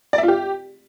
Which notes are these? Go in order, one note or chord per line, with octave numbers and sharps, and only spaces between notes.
D5
E5
F4
G4